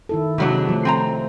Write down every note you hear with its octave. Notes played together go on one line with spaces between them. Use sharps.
D#3 E4 A4
F2 C3 D#3 F#3 G#3 D4
F3 A3
C4 G#5 A#5